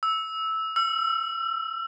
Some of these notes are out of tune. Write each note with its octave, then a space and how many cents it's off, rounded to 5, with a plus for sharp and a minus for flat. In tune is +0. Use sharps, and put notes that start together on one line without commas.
E6 -10
E6 +35